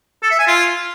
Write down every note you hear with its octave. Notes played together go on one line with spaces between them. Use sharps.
A4
E5
G#5
F4